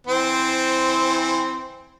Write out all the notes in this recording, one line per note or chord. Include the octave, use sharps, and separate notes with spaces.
E3 C4 C5